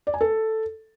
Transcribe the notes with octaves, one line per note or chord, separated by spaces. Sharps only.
D5
G#5
A4